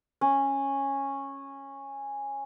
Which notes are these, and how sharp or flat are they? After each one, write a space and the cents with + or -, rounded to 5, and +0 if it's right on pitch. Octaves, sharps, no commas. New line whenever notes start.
C#4 -10